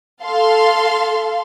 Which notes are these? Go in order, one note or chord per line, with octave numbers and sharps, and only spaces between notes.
A4 F5 C6